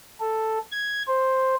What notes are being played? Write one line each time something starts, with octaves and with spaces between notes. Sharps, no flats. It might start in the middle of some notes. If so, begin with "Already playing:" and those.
A4
G#6
C5